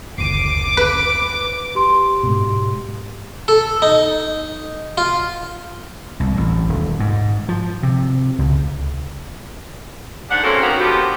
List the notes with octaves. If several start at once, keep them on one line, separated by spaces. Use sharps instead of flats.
F#1 D2 D6 C7 D7 D#7
B4
G4 C6
G#2 B2
A4
D#4
F4
C2
A1
D#1
G#2
F3
C3
C#2
G#2 D4 F#5
F#3 G#3 A#3 C4 C#4 A4
D#3 A#3 B3 C#4 F#4
D3 F3 A#3 B3 G4